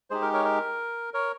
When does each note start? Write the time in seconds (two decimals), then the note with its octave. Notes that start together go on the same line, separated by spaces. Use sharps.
0.10 G#3 D#4 G4 G#4 C5
0.22 A#4
0.33 A#4 C#5
0.45 A#4
1.14 A#4 C#5